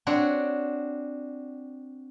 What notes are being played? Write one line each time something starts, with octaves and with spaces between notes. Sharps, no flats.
C4 D4 F#4 C#5